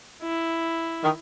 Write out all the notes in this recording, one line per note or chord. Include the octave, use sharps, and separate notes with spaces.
E4
D#3